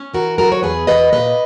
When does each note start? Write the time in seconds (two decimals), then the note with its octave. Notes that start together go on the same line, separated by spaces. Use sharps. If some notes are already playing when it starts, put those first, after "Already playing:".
Already playing: C#4
0.14 E3 F#4 A#4
0.38 F#3 F#4 A#4
0.52 C#5
0.63 E2 G#4 B4
0.87 E2 B4 D#5
1.12 A#2 B4 D#5